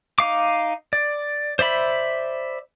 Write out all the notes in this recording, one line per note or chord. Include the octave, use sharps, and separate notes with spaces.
D#4 F5 D6
D5
C5 D5 E5 B5